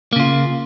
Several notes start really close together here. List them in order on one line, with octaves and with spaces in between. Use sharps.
A#3 C#3 F4